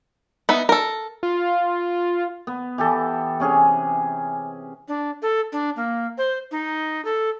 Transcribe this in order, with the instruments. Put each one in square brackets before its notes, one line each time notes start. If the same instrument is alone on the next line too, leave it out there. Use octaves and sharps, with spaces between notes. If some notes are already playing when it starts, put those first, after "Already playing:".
[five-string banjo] B3 D#4 E5
A4 A#4
[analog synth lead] F4
[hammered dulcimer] B3
E3 G4 A4
C3 C#4 G#4
[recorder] D4
A4
D4
A#3
C5
D#4
A4